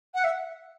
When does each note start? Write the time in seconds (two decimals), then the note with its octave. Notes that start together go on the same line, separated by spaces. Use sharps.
0.14 F#5
0.24 E5